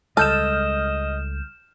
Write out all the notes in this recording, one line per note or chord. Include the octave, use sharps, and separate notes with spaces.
C#2 G3 G#3 A4 D#5 F6 G6 E7